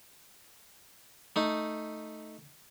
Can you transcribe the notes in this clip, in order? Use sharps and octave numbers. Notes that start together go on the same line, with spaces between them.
A3 D#4